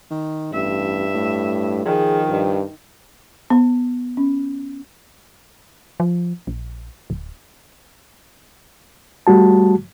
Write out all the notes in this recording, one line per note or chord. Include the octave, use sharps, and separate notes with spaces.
D#3
A1 G2 E5
A2
D#3 F3 G#4
G2
B3
C#4
F3
A#1
D1
G3 A3 F#4 A5